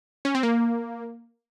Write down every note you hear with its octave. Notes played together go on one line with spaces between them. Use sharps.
C#4
C4
A#3